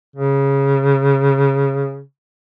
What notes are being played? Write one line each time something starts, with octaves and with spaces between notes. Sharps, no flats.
C#3